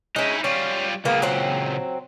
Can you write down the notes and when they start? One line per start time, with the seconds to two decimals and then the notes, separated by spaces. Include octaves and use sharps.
0.16 G#3 C#4 D#4 E4
0.44 G3 C#4 F4
1.05 C#2 A#2 A#3 B3 G#4
1.22 F#3 C4